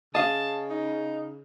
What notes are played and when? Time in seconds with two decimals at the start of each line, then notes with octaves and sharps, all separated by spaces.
0.15 C#3 D#5 F5 A5
0.70 D#4